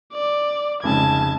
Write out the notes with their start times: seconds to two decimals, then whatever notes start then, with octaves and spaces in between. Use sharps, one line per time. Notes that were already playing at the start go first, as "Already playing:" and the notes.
0.13 D5
0.83 F1 G#2 C#3 A5 G#6